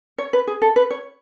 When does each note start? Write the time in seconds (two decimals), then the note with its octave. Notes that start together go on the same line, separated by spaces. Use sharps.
0.18 C#5
0.33 B4
0.47 G#4
0.62 A4
0.76 B4
0.90 C#5